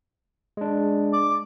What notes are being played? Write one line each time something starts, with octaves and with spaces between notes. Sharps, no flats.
G#3 D4
D6